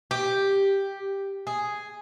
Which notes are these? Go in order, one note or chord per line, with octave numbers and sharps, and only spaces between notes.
G4
G#4